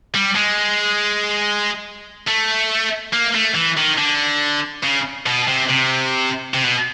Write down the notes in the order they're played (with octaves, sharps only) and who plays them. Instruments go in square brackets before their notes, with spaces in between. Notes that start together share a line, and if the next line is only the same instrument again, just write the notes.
[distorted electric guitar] G3
G#3
A3
A#3
A3
E3
D#3
D3
C#3
B2
C3
C3
C3
B2